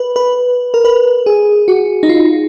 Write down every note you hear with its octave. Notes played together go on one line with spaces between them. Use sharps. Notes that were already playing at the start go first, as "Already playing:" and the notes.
Already playing: B4
B4
A#4
B4
G#4
F#4
D#4
F4